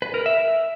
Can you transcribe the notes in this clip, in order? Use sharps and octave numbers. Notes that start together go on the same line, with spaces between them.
B4
A#4
E5